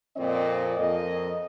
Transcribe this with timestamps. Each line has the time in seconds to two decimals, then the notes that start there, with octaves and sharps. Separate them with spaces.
0.16 F2 A#2 C4 D5 D#5
0.77 F2 A#4 D#5